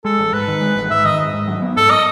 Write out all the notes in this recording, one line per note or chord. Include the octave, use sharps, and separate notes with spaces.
G#3 A4
A1
G#2 B4
D#3
G#3
A1
G#2 E5
D#3 D#5
G#2
G#2
F#3
B3
G#2 A4
D#5